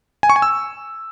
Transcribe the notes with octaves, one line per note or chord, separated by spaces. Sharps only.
G#5
C#6
G#5
E6